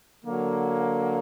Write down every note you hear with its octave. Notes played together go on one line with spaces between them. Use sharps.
D3 F#3 A#3